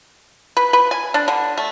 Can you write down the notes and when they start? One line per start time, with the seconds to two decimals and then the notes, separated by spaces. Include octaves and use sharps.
0.57 B4
0.73 B4
0.91 G#5
1.14 D4
1.28 D3
1.57 A3